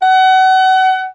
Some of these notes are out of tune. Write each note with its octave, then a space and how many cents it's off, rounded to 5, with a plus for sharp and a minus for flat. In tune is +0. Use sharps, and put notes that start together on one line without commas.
F#5 +30